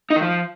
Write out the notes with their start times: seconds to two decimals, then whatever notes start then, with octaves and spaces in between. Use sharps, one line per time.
0.10 D#4
0.16 D#3
0.22 F3